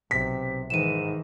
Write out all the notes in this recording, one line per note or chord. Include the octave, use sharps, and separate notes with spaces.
B1 C3 B6
G#2 D#3 E3 D#7 E7